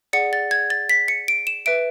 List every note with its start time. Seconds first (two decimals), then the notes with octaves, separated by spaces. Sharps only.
0.13 G#4 D5 F#5 C#7
0.33 A6
0.51 G#6
0.70 A6
0.89 B6
1.08 C#7
1.28 D7
1.47 E7
1.66 B4 E5 D7